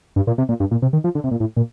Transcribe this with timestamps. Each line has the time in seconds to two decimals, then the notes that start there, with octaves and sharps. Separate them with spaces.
0.16 G2
0.27 A#2
0.38 C3
0.49 A#2
0.60 G2
0.71 A#2
0.82 C3
0.93 D#3
1.04 F3
1.15 D3
1.24 C3
1.31 A#2
1.40 A2
1.57 A#2